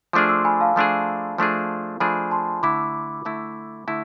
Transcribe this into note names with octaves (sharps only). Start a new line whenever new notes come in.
F3 A3 D4 G#4 D6 F6
C6 E6
G#5 B5
F5 A5
F3 A3 D4 G#4
F3 A3 D4 G#4
F3 A3 D4 G#4 G#5 B5
A5 C6
D3 A3 E4 B5 D6
D3 A3 E4
D3 A3 E4